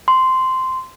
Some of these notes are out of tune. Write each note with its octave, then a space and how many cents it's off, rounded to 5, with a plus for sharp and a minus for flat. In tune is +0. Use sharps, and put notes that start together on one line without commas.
C6 -10